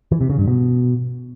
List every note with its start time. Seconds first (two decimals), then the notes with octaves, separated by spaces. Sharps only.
0.12 E3
0.21 C3
0.30 C#3
0.39 G2
0.48 B2